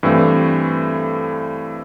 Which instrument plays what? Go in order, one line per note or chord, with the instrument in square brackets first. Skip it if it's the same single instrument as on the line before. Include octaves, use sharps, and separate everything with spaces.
[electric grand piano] G2 E3 A3 C4